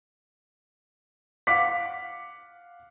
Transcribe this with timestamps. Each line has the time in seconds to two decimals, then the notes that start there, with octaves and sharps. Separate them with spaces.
1.47 F5 F#5 D6 B6